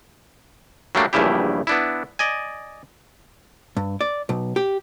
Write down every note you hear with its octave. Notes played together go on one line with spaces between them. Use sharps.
F#3 G3 A3 A#3 D4
A#1 E2 G2 C#3 E4 G4
B3 D4 E4
D5 D#5 G#5
G2
D5
B1
G4